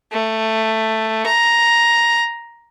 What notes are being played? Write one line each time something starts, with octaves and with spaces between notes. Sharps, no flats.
A3
A#5